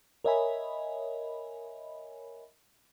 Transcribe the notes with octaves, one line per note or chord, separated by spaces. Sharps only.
A#4 C#5 D#5 E5 G#5 B5